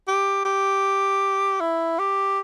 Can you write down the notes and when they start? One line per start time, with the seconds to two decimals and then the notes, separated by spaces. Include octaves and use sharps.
0.08 G4
0.45 G4
1.60 E4
1.99 G4